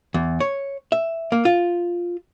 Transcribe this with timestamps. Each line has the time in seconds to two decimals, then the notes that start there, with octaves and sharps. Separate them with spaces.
0.14 E2
0.40 C#5
0.92 E5
1.32 A#3
1.45 F4